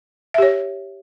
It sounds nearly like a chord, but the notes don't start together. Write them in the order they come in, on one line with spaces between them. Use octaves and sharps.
E5 G4 C#5